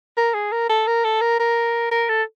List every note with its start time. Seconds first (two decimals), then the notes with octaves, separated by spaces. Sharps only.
0.17 A#4
0.34 G#4
0.52 A#4
0.69 A4
0.87 A#4
1.05 A4
1.21 A#4
1.40 A#4
1.92 A#4
2.09 A4